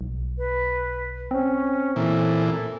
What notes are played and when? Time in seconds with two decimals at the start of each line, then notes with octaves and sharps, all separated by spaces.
0.01 B1
0.38 B4
1.31 C4 C#4
1.96 A#2 E3 A4